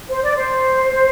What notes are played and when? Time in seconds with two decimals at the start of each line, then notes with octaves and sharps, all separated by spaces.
0.10 C5
0.23 D5
0.36 C5